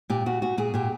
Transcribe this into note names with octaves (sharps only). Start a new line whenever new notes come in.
A#2 G4
A#2 F#4
A#2 F#4
A#2 G#4
A#2 G4